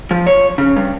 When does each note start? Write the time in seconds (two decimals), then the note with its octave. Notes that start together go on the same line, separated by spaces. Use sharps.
0.11 F3
0.27 C#5
0.58 C#3
0.77 G2